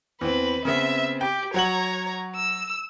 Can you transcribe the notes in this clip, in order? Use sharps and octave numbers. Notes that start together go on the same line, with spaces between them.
E2 C4 B4
C#3 B3 C4 E5
G4 G5
F#3 C#5 F#5 A#5 F#7
E6